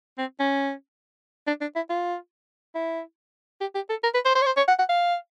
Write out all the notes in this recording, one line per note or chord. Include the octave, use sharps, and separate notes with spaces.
C4
C#4
D4
D4
E4
F4
E4
G4
G4
A4
A#4
B4
C5
C5
C#5
C5
C#5
F#5
F#5
F5